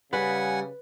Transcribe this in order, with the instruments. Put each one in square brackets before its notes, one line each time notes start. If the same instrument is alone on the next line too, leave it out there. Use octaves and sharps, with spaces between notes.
[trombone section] C#3 [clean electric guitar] G3 [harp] B4 [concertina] F#5 G#5